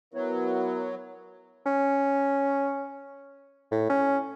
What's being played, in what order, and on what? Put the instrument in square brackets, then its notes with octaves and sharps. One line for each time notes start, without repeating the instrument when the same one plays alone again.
[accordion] F#3 [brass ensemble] B3 E4 A#4
[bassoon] C#4
A2
C#4